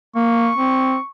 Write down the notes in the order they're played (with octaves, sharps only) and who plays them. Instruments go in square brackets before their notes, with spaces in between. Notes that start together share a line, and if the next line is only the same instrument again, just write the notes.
[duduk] A#3 [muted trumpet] C#6
[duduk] C4